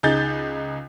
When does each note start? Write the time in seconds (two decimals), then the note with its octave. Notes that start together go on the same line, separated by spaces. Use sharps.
0.03 C#2 D#4 G#4 G6 A6